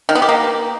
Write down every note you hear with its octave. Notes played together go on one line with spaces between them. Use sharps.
D#3
B3
G4
A#3